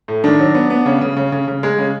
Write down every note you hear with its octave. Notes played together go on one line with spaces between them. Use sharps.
A2
D#3 D4
F#3
B3
B3
C#3
C#3
C#3
C#3
C#3
G#3
C#3